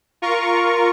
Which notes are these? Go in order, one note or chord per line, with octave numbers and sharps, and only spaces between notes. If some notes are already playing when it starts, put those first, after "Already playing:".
F4 A#4 C#6